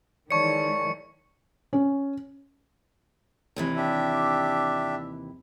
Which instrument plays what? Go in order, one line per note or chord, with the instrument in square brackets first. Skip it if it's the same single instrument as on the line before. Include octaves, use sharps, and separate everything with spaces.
[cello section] D#3 E3 G#3 [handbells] C#5 D5 A5 [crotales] C#6 C#7
[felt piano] C#4
[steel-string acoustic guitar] D#2 C3 E3
[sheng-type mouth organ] D4 G4 E5